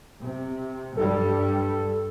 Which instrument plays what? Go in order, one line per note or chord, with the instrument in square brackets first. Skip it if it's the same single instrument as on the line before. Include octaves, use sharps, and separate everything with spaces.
[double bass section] C3
[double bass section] G2 G3 [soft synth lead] A4